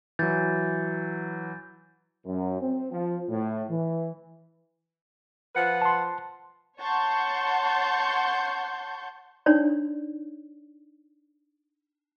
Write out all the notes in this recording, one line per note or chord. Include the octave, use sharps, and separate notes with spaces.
E3 F#3 G6 A6
F#2
C4
F3
A2
E3
F3 B4 F#5
A5 C6
C#5 F#5 A5 C6 C#6 G6
D4 D#4 C#5 D5